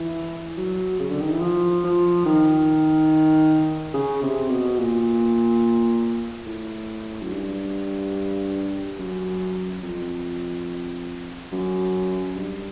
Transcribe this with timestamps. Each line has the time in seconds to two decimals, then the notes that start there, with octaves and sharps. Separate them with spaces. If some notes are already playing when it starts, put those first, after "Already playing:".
Already playing: E3
0.58 F#3
1.00 C#3
1.09 D3
1.20 D#3
1.31 E3
1.41 F3
1.84 F3
2.26 D#3
3.94 C#3
4.23 C3
4.50 B2
4.77 A#2
6.46 A2
7.22 F#2
7.31 G2
8.99 F#2
9.83 F2
11.52 F#2
12.35 G2